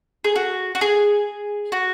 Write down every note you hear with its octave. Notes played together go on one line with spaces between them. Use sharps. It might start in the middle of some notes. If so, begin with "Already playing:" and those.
G#4
F#4
F#4
G#4
F#4